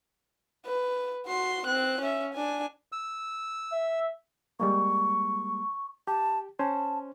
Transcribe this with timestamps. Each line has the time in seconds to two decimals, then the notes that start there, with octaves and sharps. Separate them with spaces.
0.66 B4
1.27 F#4 C6
1.66 C4 F#6
2.01 C#4 E5
2.34 D4 G#5
2.92 E6
3.73 E5
4.60 G3 G#3 A#3 C#6
6.07 G4 A5
6.59 C#4 C5 A5